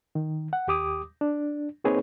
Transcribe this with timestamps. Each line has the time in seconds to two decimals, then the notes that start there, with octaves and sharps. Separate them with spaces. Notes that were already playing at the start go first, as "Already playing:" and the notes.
0.15 D#3
0.53 F#5
0.67 D#2 G4 D6 D#6
1.21 D4
1.84 A#3 C4 D#4 G#4 B4 C#5